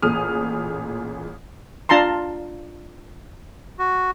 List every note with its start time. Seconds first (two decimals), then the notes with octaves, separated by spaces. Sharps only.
0.02 A1 A#2 G#4 D#6 F6 D#7
1.89 D4 F4 A5 A#5 C6
3.79 F#4